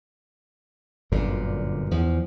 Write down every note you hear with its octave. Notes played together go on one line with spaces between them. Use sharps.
G1 F#2 A#2 D3
E2 F3